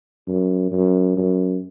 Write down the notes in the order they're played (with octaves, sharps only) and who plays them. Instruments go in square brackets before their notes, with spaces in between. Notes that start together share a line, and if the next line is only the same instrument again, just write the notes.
[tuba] F#2
F#2
F#2